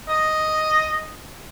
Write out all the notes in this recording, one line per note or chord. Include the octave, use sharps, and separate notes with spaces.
D#5